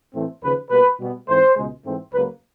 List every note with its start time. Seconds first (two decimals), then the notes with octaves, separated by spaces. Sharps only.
0.14 A2 E3 A3 C4
0.43 D#2 C#3 F3 B4
0.71 B2 G3 A#3 B4
1.00 B2 G3 B3
1.28 G#2 E3 A3 C4 C5
1.56 C#2 B2 G#3
1.85 G#2 E3 A3 C4
2.13 C#2 C#3 F#3 A#3 B4